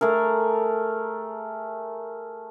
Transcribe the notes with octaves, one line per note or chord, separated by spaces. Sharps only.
A3 G#4 A#4